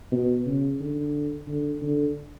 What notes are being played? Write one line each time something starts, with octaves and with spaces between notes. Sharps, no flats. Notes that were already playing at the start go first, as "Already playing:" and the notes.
B2
C#3
D3
D3
D3